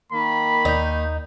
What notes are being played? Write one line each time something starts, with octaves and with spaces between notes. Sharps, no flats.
D#3 A#3 B5
D#2 D#4 G6